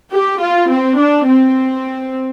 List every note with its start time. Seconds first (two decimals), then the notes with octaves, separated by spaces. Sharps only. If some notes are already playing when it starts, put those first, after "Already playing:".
0.12 G4
0.40 F4
0.69 C4
0.98 D4
1.27 C4